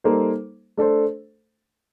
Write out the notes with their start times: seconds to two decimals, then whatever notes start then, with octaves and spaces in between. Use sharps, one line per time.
0.04 G3 A#3 D#4 A4 C5
0.77 A3 D4 A4 C5